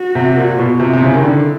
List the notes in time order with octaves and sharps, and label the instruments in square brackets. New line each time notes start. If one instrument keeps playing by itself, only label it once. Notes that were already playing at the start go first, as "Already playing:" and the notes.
Already playing: [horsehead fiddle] F#4
[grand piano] C3
A#2
[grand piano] B2 [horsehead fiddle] F4
[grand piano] C3
C3
[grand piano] C#3 [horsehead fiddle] E4
[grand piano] D#3
D3